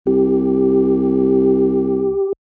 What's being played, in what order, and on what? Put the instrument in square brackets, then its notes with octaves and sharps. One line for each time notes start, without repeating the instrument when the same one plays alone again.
[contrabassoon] C2 [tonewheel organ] G4